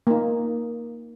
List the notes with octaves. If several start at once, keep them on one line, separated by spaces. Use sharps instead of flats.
A#3 D#4